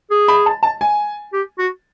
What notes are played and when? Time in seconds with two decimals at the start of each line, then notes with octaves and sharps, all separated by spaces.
0.11 G#4
0.28 B5
0.46 A5
0.63 A5
0.81 G#5
1.33 G4
1.59 F#4